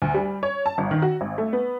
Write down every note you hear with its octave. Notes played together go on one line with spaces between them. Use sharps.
D2
G3
C#5
A5
G1
D#3
F#4
G#1
A3
B3